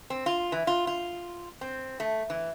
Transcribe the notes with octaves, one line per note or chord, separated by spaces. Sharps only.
C4
F4
E3
F4
F4
C4
A3
E3